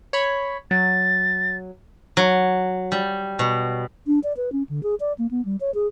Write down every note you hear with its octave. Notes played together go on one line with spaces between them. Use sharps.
C#5 B5
F#3 A6
F#3
G3
B2
D4
D5
B4
C#4
D3
G#4
D5
A#3
B3
G3
C#5
G#4